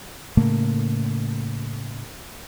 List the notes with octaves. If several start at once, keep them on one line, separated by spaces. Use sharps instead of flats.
A2 C#3 A3 A#3